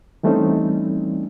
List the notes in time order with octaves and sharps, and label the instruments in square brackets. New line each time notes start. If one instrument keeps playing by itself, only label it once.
[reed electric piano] E3 G3 A3 C4 C#4 D#4